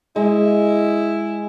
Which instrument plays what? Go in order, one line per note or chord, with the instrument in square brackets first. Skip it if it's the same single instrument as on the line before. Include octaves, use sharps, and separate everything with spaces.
[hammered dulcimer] G#3 [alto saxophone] E4